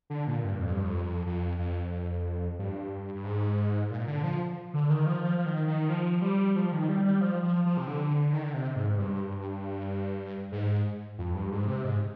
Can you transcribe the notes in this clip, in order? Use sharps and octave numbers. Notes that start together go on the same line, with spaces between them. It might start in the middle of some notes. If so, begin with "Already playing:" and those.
D3
A#2
G2
F2
G2
F2
F2
F2
G2
G2
G#2
A#2
D3
F3
D3
D#3
F3
F3
F3
D#3
D#3
F3
G3
F3
D#3
G3
G3
F3
F3
F3
C3
D3
D#3
D3
C3
G#2
G2
G#2
F2
G2
G#2
C3
G#2